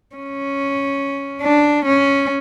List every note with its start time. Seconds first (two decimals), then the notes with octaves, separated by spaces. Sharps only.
0.15 C#4
1.42 D4
1.85 C#4